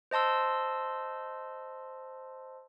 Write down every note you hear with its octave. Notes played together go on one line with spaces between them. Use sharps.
C5 D#5 A5 C6 E6